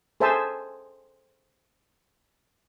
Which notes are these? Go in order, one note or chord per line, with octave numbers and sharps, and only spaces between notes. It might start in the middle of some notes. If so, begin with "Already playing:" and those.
G#4 A4 C5 E5 G#5 A5